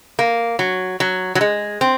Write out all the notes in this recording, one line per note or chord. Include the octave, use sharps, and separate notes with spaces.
A#3
F#3
F#3
F#3
G#3
C4